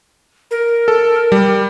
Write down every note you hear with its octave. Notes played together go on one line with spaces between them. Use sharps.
A#4
A4
G3